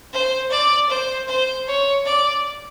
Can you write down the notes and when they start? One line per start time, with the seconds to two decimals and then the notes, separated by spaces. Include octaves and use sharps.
0.13 C5
0.51 D5
0.90 C5
1.28 C5
1.67 C#5
2.06 D5